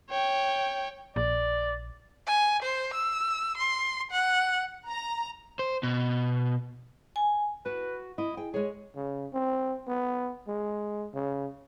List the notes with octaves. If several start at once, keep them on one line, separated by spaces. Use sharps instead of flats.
C#5 G5
A#1 D5
G#5
C5
E6
C6
F#5
A#5
C5
B2
G#5
F#4 B4
E4 D#5
G#4 G5
G#3 G#4 C#5
C#3
C4
B3
G#3
C#3